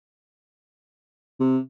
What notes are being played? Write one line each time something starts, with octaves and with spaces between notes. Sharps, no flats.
C3